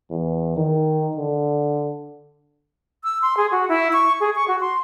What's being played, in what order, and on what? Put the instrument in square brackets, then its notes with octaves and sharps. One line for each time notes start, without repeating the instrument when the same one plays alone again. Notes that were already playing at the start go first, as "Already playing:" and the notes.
[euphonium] E2
D#3
D3
[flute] E6
C6
G#4
F#4
E4
C#6
G#4
C#6
F#4
C6